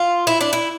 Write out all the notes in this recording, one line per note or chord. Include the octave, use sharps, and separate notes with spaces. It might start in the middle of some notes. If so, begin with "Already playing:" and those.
Already playing: F4
E4
D4
E4